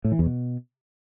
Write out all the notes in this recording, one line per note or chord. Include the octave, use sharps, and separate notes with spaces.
A2
E3
E2
B2